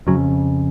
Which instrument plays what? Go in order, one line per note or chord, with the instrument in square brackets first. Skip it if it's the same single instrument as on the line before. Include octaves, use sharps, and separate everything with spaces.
[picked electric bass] F2 C#3 F#3